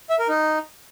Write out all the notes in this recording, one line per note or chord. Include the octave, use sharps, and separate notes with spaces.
E5
A#4
D#4